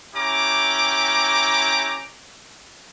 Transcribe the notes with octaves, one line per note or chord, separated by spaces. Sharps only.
C#4 E4 G4 A#5 D6